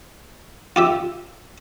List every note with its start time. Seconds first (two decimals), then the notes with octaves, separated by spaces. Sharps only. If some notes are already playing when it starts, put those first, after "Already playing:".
0.76 F4 G4 E5